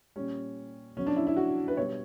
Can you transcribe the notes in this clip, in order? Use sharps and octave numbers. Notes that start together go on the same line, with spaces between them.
A#2 G3 C#4
B2 F#3 C#4
D4
E4
E4
F#4
B4
B2 G3 C#5